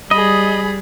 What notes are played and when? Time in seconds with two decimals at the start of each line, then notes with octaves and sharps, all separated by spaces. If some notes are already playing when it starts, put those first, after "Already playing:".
0.11 G3 G#4 D#5 B5